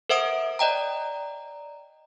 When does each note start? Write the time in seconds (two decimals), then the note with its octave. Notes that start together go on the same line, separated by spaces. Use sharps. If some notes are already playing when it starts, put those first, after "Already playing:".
0.09 A#4 C5 E5 F#5 D#6 D7
0.59 D5 D#5 G5 A#5